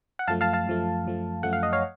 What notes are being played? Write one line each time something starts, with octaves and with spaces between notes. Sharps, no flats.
F#5
F#2 F3 A3 F5 A5
F5 A5
F5 A5
F#2 F3 A3
F#2 F3 A3
F#2 F3 A3 F#5
F5
D#5
C#5 F5